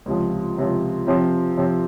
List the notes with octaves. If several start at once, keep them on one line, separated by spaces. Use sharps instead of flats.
C#2 C3 F3
C#2 C3 F3
C3 F3 C4
C3 F3 C4